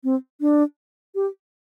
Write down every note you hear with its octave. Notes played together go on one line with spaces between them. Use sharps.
C4
D4
G4